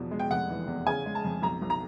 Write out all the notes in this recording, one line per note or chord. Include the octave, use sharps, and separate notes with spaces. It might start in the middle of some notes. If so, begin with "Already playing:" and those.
Already playing: E2 B2 F3
G#3
G5
F1 F#5
E3
E2
C#3 G#5
G#3
A5
F2
B1 A#5
B1
A#5